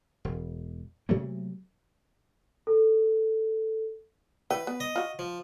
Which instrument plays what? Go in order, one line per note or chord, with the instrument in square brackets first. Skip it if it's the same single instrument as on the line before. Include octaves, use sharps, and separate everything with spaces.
[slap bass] E1
C3 F#3 A3 A#3
[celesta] A4
[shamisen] E3 G5 [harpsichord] B4
[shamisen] B3
[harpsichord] D#5
[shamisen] F4 F#4
[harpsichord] F3